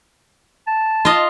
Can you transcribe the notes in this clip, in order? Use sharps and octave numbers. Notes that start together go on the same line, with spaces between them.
A5
F4 D#5